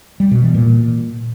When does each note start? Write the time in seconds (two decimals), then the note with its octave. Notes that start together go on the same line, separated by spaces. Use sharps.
0.20 G3
0.31 B2
0.43 E3
0.54 A#2